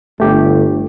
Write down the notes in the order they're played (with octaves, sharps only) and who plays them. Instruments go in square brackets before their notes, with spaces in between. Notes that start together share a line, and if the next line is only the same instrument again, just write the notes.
[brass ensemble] G1 [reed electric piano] A3 G4